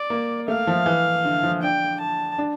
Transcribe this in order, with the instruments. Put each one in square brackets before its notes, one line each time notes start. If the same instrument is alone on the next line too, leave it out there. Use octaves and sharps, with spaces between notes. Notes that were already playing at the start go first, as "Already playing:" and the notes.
Already playing: [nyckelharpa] D5
[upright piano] A#3
[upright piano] A3 [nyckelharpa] F5
[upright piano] F3
E3
D3
F3
[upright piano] D4 [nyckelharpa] G5
[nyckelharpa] A5
[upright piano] D4